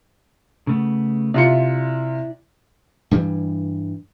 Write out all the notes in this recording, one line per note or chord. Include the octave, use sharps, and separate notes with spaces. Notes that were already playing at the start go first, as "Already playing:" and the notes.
C#3 A3 B3
C3 E4 F4 D5 C#7
G2 E3 G3